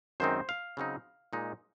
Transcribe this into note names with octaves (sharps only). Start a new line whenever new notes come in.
F#2 D#3 G#3 C4 D#4 C5
F5
C#3 F#3 C4 D#4
A#2 G#3 D#4